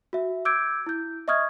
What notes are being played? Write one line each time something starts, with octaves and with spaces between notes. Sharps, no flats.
F#4 E5
D6 E6 G6 G#6 D7
E4 G6
D#5 E5 C#6 D#6 F6 G#6